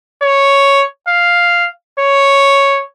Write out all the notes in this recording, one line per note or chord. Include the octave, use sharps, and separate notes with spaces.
C#5
F5
C#5